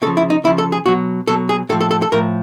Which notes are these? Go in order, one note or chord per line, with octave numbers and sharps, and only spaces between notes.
C#3 A4
F3
E4
D#4
C#3 F3 E4
A4
G#4
B2 F#3 F#4
B2 F#3 A4
G#4
A2 F3 A4
A4
A4
A4
A2 F3 A#4